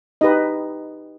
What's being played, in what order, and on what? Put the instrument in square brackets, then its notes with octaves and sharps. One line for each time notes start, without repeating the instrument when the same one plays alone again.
[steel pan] D#4 G4 B4 D#5